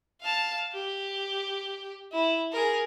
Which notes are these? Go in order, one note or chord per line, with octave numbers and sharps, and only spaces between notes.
F5 A5
G4
E4
G#4 A#4